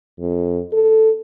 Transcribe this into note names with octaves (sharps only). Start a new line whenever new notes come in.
F2
A4